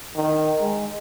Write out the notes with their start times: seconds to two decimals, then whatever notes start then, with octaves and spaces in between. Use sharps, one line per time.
0.16 D#3
0.61 G#3